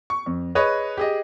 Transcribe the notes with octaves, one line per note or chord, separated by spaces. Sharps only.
C#6
F2
G#4 B4 C#5 D#5
G4 G#4 D#5